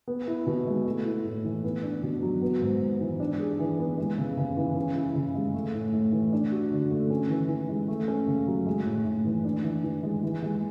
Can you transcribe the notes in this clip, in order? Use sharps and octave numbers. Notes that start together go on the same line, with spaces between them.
B3
E4
B2
G#3
A3
E4
A2
E3
B3
D4
B2
F#3
B3
G#2
G#2
E3
D4
G#4
E3
B3
G#3
C#3
C#3
E3
C#4
E4
C#3
G#3
A3
A2
A2
E3
D4
F#4
D3
A3
C#4
E3
E3
G#3
A3
C#4
C#3
F#3
G#3
A2
A2
E3
D4
E3
E3
G#3
E3
G#3